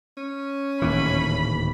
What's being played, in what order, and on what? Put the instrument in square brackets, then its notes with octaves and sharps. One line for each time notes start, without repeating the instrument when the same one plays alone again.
[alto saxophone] C#4
[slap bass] D1 D#2 E3 [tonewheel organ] A#2 [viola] B5